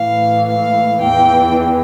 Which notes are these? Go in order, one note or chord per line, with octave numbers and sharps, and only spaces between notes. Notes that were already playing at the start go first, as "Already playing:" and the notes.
Already playing: A2 E3 F5
F5
E2 E3 G5